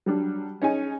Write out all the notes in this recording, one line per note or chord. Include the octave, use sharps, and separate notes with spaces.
F#3 G3 D4
C#4 D#4 G#4 G#5